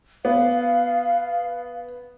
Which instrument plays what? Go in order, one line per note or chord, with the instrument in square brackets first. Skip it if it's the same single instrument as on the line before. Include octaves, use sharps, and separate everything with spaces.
[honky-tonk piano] B3 [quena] F5